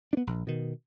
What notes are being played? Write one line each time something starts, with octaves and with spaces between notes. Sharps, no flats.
B3 D4
A#1
B2 D#3